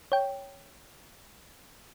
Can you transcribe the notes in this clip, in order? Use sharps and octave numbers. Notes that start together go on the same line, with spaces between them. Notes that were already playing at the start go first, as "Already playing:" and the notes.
C#5 G5